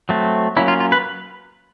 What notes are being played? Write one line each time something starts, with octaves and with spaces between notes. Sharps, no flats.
F#3 A3 C4
F#3 A#3 C#4 E4
F4
F4
B4